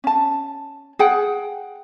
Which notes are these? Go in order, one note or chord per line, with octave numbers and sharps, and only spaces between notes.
C#4 A5
G#4 F#5 G5